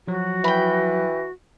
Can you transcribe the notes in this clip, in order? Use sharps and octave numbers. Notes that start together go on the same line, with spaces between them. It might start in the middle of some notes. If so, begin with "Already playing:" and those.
F3 F#3 F#4
E3 G5 B5